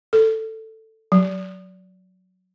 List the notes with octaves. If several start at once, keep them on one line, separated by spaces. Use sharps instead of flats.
A4
F#3